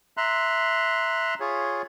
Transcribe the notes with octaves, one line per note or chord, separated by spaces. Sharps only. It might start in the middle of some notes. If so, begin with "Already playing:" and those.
E5 A#5 C6 F#6
F4 G#4 C#5